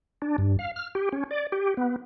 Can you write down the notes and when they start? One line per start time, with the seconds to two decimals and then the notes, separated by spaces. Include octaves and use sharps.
0.22 D4
0.38 G2
0.59 F5
0.76 F6
0.95 G4
1.12 C#4
1.31 D5
1.52 G4
1.77 B3